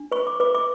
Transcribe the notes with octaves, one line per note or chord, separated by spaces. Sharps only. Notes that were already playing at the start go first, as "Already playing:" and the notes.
Already playing: D4
B4 C#6
D6
B4 D6
D6